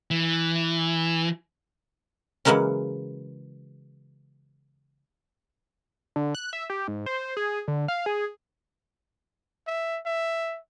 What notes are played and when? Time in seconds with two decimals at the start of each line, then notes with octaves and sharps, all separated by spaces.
0.11 E3
2.45 C#3 E3 F#3 G#3 A#3 C#4
6.16 D3
6.35 F#6
6.53 E5
6.70 G4
6.88 G#2
7.06 C5
7.37 G#4
7.68 D3
7.88 F5
8.06 G#4
9.67 E5
10.06 E5